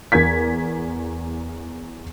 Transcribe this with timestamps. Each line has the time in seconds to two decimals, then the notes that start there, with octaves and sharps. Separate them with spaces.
0.12 E2 A#4 G#6 B6